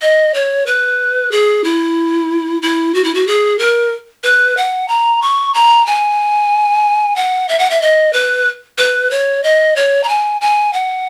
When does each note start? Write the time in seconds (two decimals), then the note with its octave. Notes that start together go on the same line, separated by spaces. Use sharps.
0.02 D#5
0.34 C#5
0.66 B4
1.32 G#4
1.64 E4
2.62 E4
2.95 F#4
3.04 E4
3.15 F#4
3.27 G#4
3.59 A#4
4.24 B4
4.57 F#5
4.88 A#5
5.22 C#6
5.54 A#5
5.87 G#5
7.16 F#5
7.49 E5
7.59 F#5
7.70 E5
7.82 D#5
8.13 B4
8.78 B4
9.11 C#5
9.44 D#5
9.76 C#5
10.04 A#5
10.09 G#5
10.41 G#5
10.73 F#5